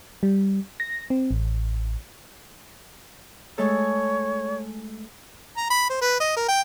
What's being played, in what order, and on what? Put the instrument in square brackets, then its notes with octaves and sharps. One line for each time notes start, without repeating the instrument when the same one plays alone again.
[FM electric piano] G3
A#6
C4
A1
[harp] G#3 A3 A4 [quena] C#5
[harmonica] A#5
B5
C5
B4
D#5
A#4
G5